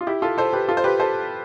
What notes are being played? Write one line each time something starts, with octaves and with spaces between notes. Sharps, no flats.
F4
E4 G4
F4 A4
A4 C5
G4 B4
F4 A4
C5
G4 B4
A4 C5